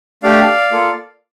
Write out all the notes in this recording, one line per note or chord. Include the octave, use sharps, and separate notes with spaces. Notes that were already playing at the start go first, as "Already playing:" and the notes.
A3 D4 G4 D5 F5
A#3 F4 A4